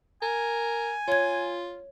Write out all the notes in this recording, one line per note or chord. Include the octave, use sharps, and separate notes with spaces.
A#4 G#5
F4 C#5 G#6